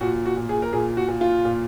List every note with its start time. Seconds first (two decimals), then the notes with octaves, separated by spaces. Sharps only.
0.01 A#2 F#4
0.26 F#4
0.37 A#2
0.49 G#4
0.62 A#4
0.73 A#2 G#4
0.97 F#4
1.08 A#2
1.21 F4
1.45 A#2